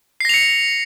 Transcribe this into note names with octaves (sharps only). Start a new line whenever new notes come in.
A#6 C7 C#7 F7